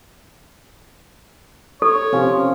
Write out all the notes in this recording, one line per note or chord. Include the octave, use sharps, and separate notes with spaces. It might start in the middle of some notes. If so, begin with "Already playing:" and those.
A4 C#5
C3 F3 C#4